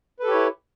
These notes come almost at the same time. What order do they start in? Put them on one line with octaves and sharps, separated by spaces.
B4 A4 G4 C#5 E4